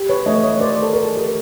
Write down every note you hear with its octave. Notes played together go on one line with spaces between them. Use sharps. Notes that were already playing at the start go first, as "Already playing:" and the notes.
Already playing: G4
B4 C#5
A3 C#5 D#5
C#5 D#5
C#5
A#4 C5 D5
A4
A#4
G#4
G4